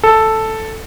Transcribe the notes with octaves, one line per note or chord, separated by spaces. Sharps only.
A4